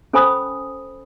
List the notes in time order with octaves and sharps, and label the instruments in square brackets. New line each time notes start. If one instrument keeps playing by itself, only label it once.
[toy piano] C#4 A4 C5 G#5 B5 D#6